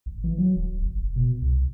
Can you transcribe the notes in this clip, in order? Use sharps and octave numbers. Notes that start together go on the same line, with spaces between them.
A1
E3
F#3
D#1
G1
F1
B2
C2